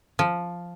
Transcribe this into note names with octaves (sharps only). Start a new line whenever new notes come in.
F3